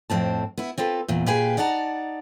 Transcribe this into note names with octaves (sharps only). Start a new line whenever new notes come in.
F2 A2 C4 A5
B3 E4
C4 F4 A4 B4
E2 A#2
A#2 G4 G#4 B4 G5 G#5
D#4 D5 F#5 A5 A#5